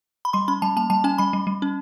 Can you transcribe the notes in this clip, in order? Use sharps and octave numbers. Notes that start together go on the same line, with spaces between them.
B5
G3 C6
C#4 B5
G3 A5
A#3 A5
G3 A5
C#4 G#5
G3 B5
G3
G3
C#4